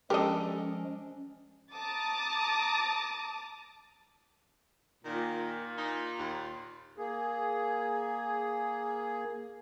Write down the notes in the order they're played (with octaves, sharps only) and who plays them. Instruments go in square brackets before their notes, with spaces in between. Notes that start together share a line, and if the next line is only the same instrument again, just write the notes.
[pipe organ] F3 G#3 [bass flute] C#4 [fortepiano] D4 A4 A#4 [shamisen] G4 D#5
[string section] A5 A#5 D6 D#6 A6
[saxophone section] A#2 [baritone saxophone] D#3
[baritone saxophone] D#4
D#2
[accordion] A#3 G#4